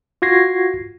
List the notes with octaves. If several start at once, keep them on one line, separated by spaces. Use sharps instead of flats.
F4 F#4 G#6 A#6 C7